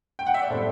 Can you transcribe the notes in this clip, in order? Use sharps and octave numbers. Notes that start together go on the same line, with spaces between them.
G5
F#5
E5
D5
A2 G3 C4 A4 C5